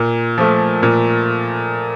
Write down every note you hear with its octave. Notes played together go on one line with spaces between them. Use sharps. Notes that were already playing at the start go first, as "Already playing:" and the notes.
Already playing: A#2
F3 A3
A#2